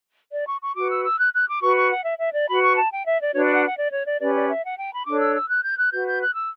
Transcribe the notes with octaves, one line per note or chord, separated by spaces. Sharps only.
D5
C#6
C#6
F#4 B4 D6
E6
E6
F#6
F#6
D6
F#4 B4 C#6
C#6
F#5
E5
E5
D5
F#4 B4 B5
C#6
A5
G5
E5
D5
D4 F#4 B4 C#5
D5
F#5
F#5
D5
C#5
D5
C#4 G4 B4 D5
D5
E5
F#5
G5
B5
D4 A4 C#5 D6
E6
E6
F#6
G6
F#6
F#4 B4 G6
G6
F#6
E6